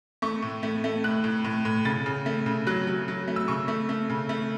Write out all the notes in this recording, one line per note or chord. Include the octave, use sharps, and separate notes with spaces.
A3 C#6
A2
A3
A3
A2 F#6
A2
A2
A2
C#3 A6
C#3
A3
C#3
F#3 F#6
F#3
F#3
A3
E6
C#3 C#6
A3
A3
C#3
A3